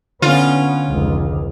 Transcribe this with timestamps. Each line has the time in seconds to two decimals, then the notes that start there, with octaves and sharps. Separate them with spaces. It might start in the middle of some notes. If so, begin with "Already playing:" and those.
0.22 D3 B3 C#4 F4
0.89 F1 C#2